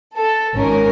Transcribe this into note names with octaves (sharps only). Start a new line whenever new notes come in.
A4
G#1 G#2 C#4 A#4